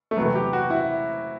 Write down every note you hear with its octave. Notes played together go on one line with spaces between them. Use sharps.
A3
E2 C3 F#3 B3
G4
F#4
E4